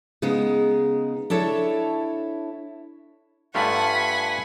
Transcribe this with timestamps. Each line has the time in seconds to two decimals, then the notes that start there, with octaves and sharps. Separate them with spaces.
0.22 C#3 G#3 B3 D#4
1.30 D4 E4 A4 C#5
3.55 G2 A3 F4 F#5 G#5 B5